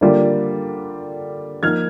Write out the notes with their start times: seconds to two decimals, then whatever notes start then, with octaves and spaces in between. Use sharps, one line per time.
0.01 D3 G3 A#3 D4 F4
1.63 F3 A#3 D#4 F6 G#6